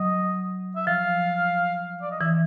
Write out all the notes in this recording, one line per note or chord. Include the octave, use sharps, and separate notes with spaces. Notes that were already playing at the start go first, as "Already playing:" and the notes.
Already playing: F#3 D#5
E5
F3 F5
D5
D#5
E3 E5